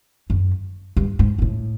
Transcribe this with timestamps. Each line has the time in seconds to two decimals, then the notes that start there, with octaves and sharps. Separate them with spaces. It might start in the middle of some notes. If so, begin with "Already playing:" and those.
0.30 F#2
0.97 G2
1.19 G#2
1.38 G#2
1.42 A2